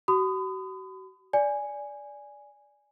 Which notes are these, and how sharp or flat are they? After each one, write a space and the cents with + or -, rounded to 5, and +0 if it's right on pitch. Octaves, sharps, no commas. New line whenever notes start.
F#4 +40 B5 +40 D#6 -15
D5 -10 G#5 +0